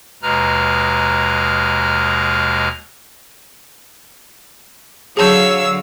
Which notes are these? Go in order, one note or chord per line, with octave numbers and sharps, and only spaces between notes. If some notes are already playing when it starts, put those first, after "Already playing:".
D#2 B2 G#3 B4 A#5 F6
D3 F#3 G#4 C#5 F5 A5 E6 G6